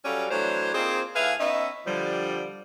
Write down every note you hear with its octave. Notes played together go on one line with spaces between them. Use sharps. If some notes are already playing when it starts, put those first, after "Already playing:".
F#3 G3 C#4 A4 D5 F5
E3 F#3 A3 D4 C5 C#5
A#3 C4 D#4 F4 G#4 C5
A2 G#4 B4 E5 F5
B3 C#4 D#4 D#5 E5
D3 F3 G3